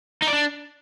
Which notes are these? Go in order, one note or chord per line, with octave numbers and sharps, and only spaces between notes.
D#4
D5
D4